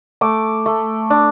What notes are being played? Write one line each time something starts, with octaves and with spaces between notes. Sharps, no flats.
A3 D6
A3
D4